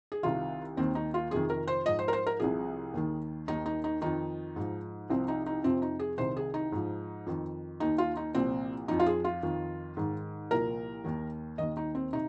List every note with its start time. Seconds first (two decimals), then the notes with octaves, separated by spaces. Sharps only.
0.12 G#4
0.23 C2 C3 D#3 F4
0.77 D#2 D#3 C4
0.95 D#4
1.14 F4
1.31 F2 C3 D#3 G#4
1.50 A#4
1.67 C5
1.86 G#2 F3 D#5
1.99 C5
2.08 A#4
2.13 C5
2.26 A#4
2.40 C2 C3 F3 G#4
2.94 D#2 D#3
3.48 D#2 D#3 D#4
3.66 D#4
3.84 D#4
4.01 F2 D#3 D#4
4.56 G#2 F3
5.10 C2 C3 F3 C4
5.28 D#4
5.46 D#4
5.64 F2 C3 F3 C4
5.82 D#4
5.99 G#4
6.18 C2 C3 D#3 C5
6.37 G#4
6.54 D#4
6.72 G#2 F3
7.26 F2 D#3
7.80 D#2 D#3 D#4
7.98 F4
8.17 D#4
8.34 C2 A#2 F3 C4
8.88 F2 F3 D#4
8.99 F4
9.06 G#4
9.24 F4
9.43 F2 D#3
9.97 G#2 D#3
10.51 C2 A#2 F3 A#4
11.04 D#2 D#3
11.58 D#2 D#3 D#5
11.77 D#4
11.95 C4
12.13 C3 D#4